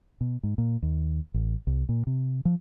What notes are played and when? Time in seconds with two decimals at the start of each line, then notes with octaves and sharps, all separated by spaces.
0.21 B2
0.43 G#2
0.58 A#2
0.82 D#2
1.34 A1
1.67 C2
1.89 A#2
2.07 C3
2.45 F3